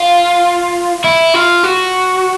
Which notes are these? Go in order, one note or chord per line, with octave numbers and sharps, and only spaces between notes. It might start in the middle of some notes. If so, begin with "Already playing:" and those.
Already playing: F4
E4
F4
F#4